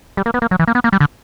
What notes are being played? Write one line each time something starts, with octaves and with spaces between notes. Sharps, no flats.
G3
A#3
B3
A#3
F#3
E3
A#3
B3
A#3
G3
D3